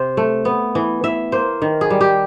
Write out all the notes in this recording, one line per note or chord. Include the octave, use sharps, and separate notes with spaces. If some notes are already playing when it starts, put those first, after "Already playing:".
Already playing: C3 C5
A3
B3
E3
E3 E5
A#3 C5
D#3
G#4
G3
G4